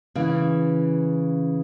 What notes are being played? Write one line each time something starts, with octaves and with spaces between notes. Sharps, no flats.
C#3 E3